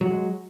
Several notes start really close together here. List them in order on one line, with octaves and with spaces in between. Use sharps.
F#3 F#4 G#3